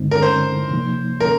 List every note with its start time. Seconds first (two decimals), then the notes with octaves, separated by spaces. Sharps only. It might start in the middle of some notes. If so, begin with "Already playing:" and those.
Already playing: G2 D3 G#3 C4 D#4
0.11 A#4
0.22 C5
0.70 C3 F3 A#3 D#4
1.20 A#4